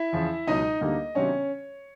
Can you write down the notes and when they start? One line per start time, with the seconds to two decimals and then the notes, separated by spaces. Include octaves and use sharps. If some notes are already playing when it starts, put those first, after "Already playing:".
Already playing: E4 E5
0.13 E2 C#3 F3
0.47 C#2 B2 F#3 D#4 D#5
0.81 D2 D3 G3 A#3 D#4
1.15 C3 D#3 F#3 B3 C#4 D4 C#5